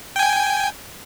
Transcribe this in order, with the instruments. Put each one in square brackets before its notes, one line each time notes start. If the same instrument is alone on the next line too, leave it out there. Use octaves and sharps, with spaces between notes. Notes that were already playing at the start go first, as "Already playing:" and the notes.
[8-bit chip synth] G5 G#5